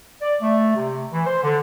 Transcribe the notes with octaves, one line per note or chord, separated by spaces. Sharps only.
D5
A3
C3
E3
C5
D3